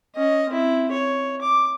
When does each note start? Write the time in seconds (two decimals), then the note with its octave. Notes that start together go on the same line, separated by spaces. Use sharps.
0.15 C#4 D#5
0.49 C4 E4
0.92 C#5
1.41 D6